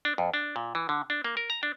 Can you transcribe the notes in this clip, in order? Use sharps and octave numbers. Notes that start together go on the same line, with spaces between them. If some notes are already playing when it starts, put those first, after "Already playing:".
D4
F2
D4
A#2
E3
D3
D4
A#3
A#4
A#5
D4